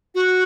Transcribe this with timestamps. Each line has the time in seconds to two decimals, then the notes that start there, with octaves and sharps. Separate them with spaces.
0.15 F#4